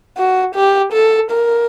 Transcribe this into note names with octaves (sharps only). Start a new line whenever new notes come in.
F#4
G4
A4
A#4